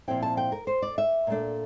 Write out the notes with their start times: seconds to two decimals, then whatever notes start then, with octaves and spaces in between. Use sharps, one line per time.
0.08 A#2 F3 C4 E4 G5
0.23 A5
0.37 G5
0.52 A#4
0.67 C5
0.82 D5
0.98 E5
1.27 A#2 A3 D4